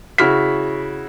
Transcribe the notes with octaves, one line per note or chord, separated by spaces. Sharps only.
C#3 E4 F#4 F6 B6